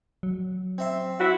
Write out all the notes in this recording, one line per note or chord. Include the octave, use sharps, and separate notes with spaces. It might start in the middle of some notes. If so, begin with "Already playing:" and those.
F#3
C4 E5 C6
E4 F#4